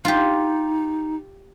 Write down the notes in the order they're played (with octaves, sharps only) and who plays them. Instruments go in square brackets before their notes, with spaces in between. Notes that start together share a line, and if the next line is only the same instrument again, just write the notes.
[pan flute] D#4 [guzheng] F4 G4